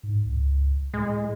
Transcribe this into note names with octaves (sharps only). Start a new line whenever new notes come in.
G#2
C#2
A2 G#3